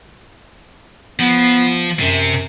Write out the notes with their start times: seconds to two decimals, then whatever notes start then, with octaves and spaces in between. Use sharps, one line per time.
1.19 F3 B3
2.00 F#2 C3